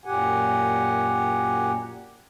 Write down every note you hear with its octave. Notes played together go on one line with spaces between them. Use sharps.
F#2 A#2 G4 F#5 G#5